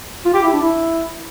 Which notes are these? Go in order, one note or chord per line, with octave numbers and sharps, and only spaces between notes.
F4
G4
E4
D4
E4